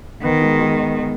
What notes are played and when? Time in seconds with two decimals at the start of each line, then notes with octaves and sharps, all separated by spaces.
0.23 D#3 B3
0.42 G#3
0.60 G#3